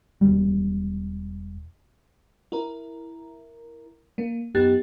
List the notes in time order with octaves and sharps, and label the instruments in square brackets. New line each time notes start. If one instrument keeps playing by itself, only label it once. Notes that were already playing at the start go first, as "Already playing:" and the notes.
[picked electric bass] E1 G3
[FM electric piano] E4 A#4
A#3
F#2 B3 D#4 G4 F#6 A6